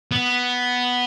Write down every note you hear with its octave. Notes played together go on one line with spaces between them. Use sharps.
B3